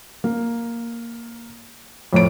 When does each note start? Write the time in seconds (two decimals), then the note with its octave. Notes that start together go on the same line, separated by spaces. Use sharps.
0.24 A#3
2.13 F2 A2 C#5 D7